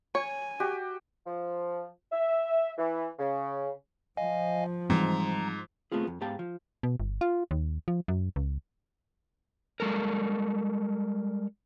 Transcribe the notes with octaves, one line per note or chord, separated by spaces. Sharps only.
C#5 G#5
F#4 G4
F3
E5
E3
C#3
F3 D#5 F5 G#5
G#2 E3 G3 C4 A#5
A3 B3 C4 F4 G#4
F2
G#2 B3 G4 F5 A5
F3
B2
G1
F4
D#2
F3
F#2
C#2
G3 G#3 A4 A#4